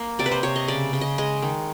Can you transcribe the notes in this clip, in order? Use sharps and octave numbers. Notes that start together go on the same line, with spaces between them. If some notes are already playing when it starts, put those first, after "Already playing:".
Already playing: A#3
C3 D5
B4
C5
C3 C#5
D#5
C#3 D5
C#3
D#5
G#3 D#5
D#3